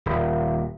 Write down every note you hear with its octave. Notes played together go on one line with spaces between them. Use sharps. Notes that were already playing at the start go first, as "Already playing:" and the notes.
D#1